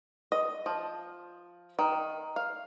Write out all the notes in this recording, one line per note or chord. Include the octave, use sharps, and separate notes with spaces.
D#5
F3
D#3
F5